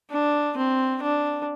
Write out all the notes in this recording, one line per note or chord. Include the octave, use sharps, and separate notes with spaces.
D4
C4
D4